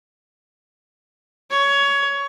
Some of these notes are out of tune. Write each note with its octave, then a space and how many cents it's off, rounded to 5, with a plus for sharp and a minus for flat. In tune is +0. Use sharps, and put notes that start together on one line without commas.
C#5 +15